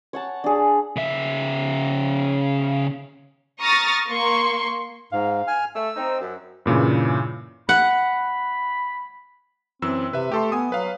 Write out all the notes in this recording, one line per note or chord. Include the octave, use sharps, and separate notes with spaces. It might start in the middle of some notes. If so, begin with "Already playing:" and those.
C#5 F#5 A5
D4 G#4
C#3 E5
A#5 C#6 D#6 F6 A6 A#6
A#3 C6 C#6
G#2 F5
G#5 F6
A3 E6
C4 D#4
F#2
G2 A#2 C#3 E3
F#5 B5
F#2 E3 C4 E6
C3 B4 E5
A3 G4 A4 C6
B3 G#5 D#6
F#3 B4 F5